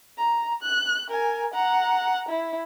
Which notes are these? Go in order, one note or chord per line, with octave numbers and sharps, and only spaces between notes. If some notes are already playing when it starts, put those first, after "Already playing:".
A#5
F#6
A#4 G#5
F#5 A#5
E4